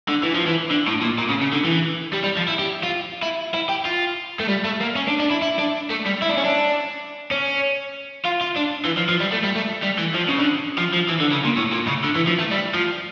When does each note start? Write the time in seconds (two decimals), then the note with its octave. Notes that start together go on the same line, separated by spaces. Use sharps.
0.08 D3
0.23 E3
0.34 F3
0.46 E3
0.71 D3
0.87 A2
1.02 A#2
1.19 A#2
1.29 C#3
1.42 C#3
1.53 D3
1.65 E3
2.13 G3
2.24 G3
2.37 F3
2.48 E4
2.59 G4
2.84 F4
3.23 E4
3.55 E4
3.69 G4
3.85 F4
4.40 A3
4.48 G3
4.64 A3
4.80 A#3
4.95 C#4
5.08 D4
5.19 D4
5.30 E4
5.42 E4
5.59 D4
5.90 A3
6.06 G3
6.22 E4
6.29 D4
6.37 C#4
6.45 D4
7.31 C#4
8.25 F4
8.42 F4
8.57 D4
8.85 E3
8.97 F3
9.09 F3
9.21 G3
9.32 A3
9.44 G3
9.56 A3
9.83 G3
9.99 E3
10.15 F3
10.29 C#3
10.39 D3
10.78 F3
10.94 F3
11.09 E3
11.21 D3
11.32 C#3
11.45 A#2
11.57 A2
11.72 A#2
11.88 C#3
12.04 D3
12.16 E3
12.27 F3
12.39 A3
12.51 G3
12.74 F3